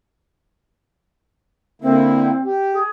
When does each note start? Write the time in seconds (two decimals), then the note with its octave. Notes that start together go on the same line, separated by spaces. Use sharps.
1.82 D3 A#3 C4 E4
2.45 G4
2.73 G#4